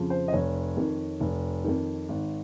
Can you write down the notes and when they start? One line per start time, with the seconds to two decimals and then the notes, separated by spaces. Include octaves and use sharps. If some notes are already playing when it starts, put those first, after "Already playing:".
Already playing: F2 C#3 F3
0.10 C5
0.28 D#5
0.33 F1 C#5
0.77 F2 D#3
1.20 F1
1.65 F2 D#3
2.09 G#1